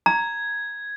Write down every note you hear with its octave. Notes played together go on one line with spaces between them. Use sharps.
A#5 G#6